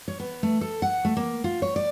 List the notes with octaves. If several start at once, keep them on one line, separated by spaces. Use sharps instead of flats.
C#5
B3
A3
A4
F#5
A3
A#3
F4
C#5
D5